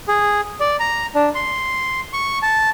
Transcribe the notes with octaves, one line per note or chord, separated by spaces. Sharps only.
G#4
D5
A#5
D4
C6
C#6
A5